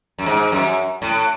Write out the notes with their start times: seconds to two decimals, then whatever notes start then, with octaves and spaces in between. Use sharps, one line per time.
0.18 F#2
0.26 G#2
0.52 F#2
1.02 A2